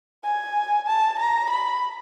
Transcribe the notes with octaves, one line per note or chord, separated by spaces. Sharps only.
G#5
A5
A#5
B5